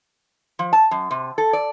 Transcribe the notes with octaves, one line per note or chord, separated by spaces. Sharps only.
F3
A5
F#2
C3
A4
D5